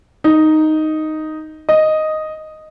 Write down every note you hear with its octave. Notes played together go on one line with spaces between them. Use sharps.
D#4
D#5